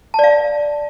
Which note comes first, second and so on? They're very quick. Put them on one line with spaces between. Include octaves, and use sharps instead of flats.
A5 D5 F5